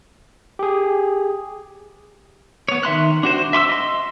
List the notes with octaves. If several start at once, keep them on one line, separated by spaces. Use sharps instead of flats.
G4 G#4
B3 C#5
D#3 E5 C6 F#6
D4 F#4 C5
E5 C6 C#6 E6
D#5 C6